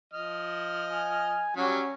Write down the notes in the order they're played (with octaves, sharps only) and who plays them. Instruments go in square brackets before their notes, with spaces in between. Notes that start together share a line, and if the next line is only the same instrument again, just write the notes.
[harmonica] F3 D#5 F6
[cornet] G#5
[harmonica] F#3 G3 [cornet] C#4